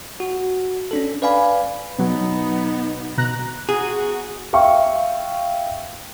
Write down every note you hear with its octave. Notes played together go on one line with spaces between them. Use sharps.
F#4
C#4 D4 A4
B4 D5 F5 G#5 B5
B2 F#3 B3 D#4
B2 A#5 F#6
F#4 G#4
E5 F5 G5 C#6